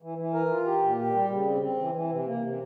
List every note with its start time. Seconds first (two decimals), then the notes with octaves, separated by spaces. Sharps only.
0.02 E3
0.18 E3
0.34 A#4
0.51 F4
0.66 G4
0.83 A#2
0.99 G4
1.14 G3
1.30 C#3
1.46 C4
1.62 C4
1.79 E3
1.94 E3
2.10 C3
2.26 A#3
2.43 C3